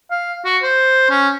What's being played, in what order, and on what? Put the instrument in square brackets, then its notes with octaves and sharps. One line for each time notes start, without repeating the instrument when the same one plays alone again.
[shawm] F5
F#4
C5
C#4